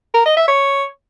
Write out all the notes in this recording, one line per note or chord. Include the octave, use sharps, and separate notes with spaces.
A#4
D#5
E5
C#5